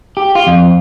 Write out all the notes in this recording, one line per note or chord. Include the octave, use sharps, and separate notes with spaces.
G4
F4
F2